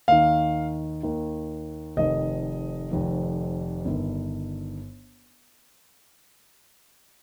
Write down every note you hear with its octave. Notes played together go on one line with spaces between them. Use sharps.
D#2 D#3 F5
D#2 D#3
F1 F2 D#3 D#5
F1 F2 D#3
G1 G2 D#3